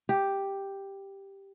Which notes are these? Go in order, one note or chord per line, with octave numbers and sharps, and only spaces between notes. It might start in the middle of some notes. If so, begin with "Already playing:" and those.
G4